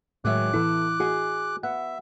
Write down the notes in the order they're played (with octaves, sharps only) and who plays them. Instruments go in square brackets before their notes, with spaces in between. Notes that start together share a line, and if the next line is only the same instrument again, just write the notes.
[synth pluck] A2 E5 [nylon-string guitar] D#3 F#3 G#3 [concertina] D6 F#6
[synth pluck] E3 E4 [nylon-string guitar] B3 A4
[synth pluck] F#4 [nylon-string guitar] G#4 D#5
[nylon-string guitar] B3 [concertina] E5 [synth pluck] F#5